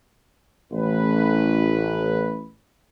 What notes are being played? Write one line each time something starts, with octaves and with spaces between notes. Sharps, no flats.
A1 B4